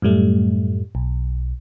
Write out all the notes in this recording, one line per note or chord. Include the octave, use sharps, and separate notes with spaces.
F#2 A2 G3 A3
B1